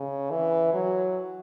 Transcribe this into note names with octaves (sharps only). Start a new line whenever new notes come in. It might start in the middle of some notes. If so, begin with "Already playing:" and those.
Already playing: C#3
E3
F#3